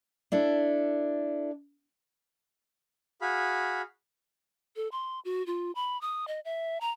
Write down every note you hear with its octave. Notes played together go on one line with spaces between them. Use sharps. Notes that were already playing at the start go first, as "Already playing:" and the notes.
D4 E4 A4
F#4 G#4 F5 B5
A4
C6
F#4
F4
B5
D#6
D#5
E5
A#5